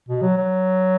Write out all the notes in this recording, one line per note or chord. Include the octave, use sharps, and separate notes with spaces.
B2
F#3
F#3